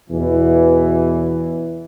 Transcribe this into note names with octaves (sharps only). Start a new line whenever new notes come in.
E2 B2 E3